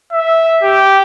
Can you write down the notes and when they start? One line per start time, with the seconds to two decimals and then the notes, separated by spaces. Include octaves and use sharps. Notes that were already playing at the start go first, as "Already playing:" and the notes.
0.12 E5
0.63 G4